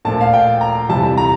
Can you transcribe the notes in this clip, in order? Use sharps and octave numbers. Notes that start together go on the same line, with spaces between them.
A#1 A#2 A3 A5
F5
G5
A#5
F2 C3 E3 G3 A5
A#5